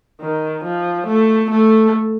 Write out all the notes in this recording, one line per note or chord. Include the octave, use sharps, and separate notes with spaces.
D#3
F3
A3
A3